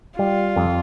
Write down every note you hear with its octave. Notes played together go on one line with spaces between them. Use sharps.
G3 F4
F2